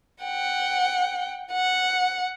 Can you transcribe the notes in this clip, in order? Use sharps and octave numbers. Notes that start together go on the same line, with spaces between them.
F#5 G5
F#5